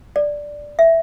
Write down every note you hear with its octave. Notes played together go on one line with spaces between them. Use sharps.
D5
E5